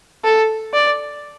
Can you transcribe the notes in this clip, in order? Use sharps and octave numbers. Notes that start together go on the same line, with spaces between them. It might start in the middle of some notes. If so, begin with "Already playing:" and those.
A4
D5